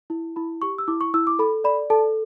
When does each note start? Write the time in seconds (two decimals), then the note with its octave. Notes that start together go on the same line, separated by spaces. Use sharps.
0.10 E4
0.36 E4 B5
0.62 G4 C#6
0.78 E6
0.88 E4 D6
1.01 C#6
1.14 E4 E6
1.27 D6
1.39 A4 B5
1.64 D5 B5
1.90 A4 A5